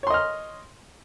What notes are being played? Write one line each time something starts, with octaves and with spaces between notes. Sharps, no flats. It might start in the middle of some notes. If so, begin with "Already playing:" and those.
C#5 D#5 C6 F6